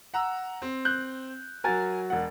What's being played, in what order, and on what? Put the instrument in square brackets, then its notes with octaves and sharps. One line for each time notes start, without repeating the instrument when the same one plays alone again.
[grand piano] F#5 A#5 E6
C4
[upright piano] F#6 G6
[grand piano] F#3 F#4 [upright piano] A#4 G#5 A6
[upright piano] E1 F#5